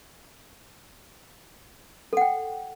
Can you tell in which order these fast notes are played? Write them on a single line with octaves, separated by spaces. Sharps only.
A4 F#5 G5